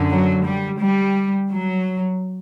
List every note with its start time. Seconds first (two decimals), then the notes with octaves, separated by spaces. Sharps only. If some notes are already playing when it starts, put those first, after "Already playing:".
Already playing: F#2 D3
0.11 F#3
0.45 G3
0.81 G3
1.51 F#3